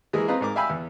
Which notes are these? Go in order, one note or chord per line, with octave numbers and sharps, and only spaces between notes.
E3 G#3 A#3 G#4 A#4
C4 F4 B4 D#5 F5 A#5
G#2 A#4 D6
E5 F5 G5 G#5 B5 E6
E2